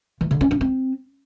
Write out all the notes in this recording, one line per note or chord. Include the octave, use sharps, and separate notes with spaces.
E3
D3
C#4
D4
C4